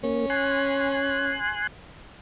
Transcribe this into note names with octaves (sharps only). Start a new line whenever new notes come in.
A#3 C#4
G#5 C6 F#6